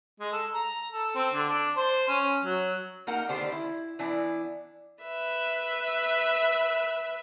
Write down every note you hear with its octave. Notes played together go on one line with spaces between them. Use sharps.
G#3
A4
A#5
A4
C4
D3
D4
C5
C#4
F#3
A#3 D#4 A#4 F#5 A#5
D3 D#3 B3 D4 G4 C5
E4
E3 B3 D4 E4
B4 E5